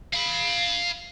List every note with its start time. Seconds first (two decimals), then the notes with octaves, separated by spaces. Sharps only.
0.14 F5 B5